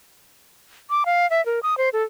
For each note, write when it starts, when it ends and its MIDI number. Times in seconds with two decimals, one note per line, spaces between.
0.90 1.04 86
1.06 1.29 77
1.30 1.44 76
1.46 1.60 70
1.63 1.78 87
1.78 1.89 72
1.93 2.03 69